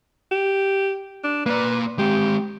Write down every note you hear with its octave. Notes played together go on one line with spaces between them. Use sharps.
G4
D4
A#3 B4 D5
G#3 C4 G4